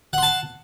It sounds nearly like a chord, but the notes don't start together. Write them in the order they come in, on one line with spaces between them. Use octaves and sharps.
F#5 C6 A5